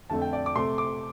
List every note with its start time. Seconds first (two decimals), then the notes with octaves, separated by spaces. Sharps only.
0.10 F2 D3 A3 A5
0.22 G5
0.33 D5
0.46 D6
0.56 C3 A3 C6
0.78 D6